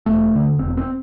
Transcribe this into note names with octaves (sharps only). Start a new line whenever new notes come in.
E1 A3
D2 D3
E1 C4
C4